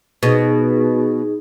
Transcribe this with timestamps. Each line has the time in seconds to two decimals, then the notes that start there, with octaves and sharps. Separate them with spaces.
0.23 B2 D#4 G#4